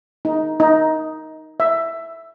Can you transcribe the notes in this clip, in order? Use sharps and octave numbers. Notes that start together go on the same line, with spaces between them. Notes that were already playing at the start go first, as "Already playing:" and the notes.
D#4
D#4
E5